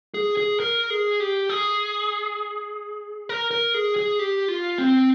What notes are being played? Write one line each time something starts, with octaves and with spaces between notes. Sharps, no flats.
G#4
G#4
A#4
G#4
G4
G#4
A#4
A#4
G#4
G#4
G4
F4
C4